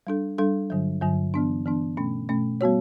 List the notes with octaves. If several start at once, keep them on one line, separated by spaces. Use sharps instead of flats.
G3 D4 A4
G3 D4 A4
G2 D3 F#3
G2 D3 F#3
E3 B3 D4
E3 B3 D4
B2 A3 C#4
B2 A3 C#4
G3 B3 F#4 C#5